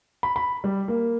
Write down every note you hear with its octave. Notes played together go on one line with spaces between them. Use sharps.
B5
B5
G3
A#3